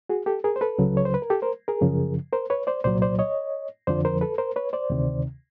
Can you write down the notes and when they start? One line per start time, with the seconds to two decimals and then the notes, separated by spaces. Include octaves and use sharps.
0.09 F#4 G#4
0.26 G4 A4
0.44 G#4 A#4
0.56 C5
0.61 A4 B4
0.79 C#2 C#3 F#3
0.97 C#5
1.05 C5
1.14 B4
1.22 A#4
1.30 G4 A4
1.42 A#4 C5
1.68 G#4 A#4
1.81 F#2 C#3 F3
2.32 A#4 C5
2.50 B4 C#5
2.67 C5 D5
2.84 C2 A#2 F#3 C5 D5
3.02 C5 D5
3.19 C#5 D#5
3.87 F2 D3 F3 C5 D5
4.05 A#4 C5
4.21 A4 B4
4.38 A#4 C5
4.56 B4 C#5
4.73 C5 D5
4.90 D2 C3 D#3